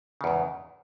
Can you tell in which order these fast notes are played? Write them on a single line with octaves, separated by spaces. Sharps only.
C#3 E2 G#2